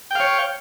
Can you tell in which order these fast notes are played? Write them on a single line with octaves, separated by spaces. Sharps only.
G5 F5 C#5